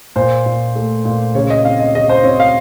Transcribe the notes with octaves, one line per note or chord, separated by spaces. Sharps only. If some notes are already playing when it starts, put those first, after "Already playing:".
A#2 C5
A#2
A3
A#2
C#3 C#5
D#5
C4 F5
D#5
C#3 D#5
C5
C4 C#5
F5